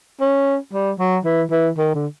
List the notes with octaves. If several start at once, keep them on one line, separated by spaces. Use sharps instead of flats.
C#4
G3
F#3
E3
E3
D#3
D3